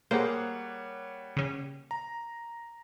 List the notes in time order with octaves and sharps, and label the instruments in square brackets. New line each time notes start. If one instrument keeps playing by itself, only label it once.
[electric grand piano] G3 C#5 F#5 [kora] A#3 G#4 [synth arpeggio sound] C5
[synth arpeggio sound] C#3 C#4
[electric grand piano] A#5